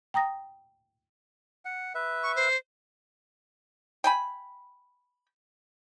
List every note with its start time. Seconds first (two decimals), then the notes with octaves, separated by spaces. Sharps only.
0.14 G5 A#5 D#6 A#6
1.65 F#5
1.95 B4 E5
2.23 C#6
2.36 C5
4.04 G5 G#5 B5